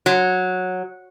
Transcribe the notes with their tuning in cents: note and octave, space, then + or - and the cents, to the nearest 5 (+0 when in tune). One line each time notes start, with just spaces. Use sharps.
F#3 -10